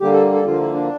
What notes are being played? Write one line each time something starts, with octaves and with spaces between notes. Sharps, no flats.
D3 G3 A#3 G4
A4
A4
D3 F3 A#3 F4
E4
D4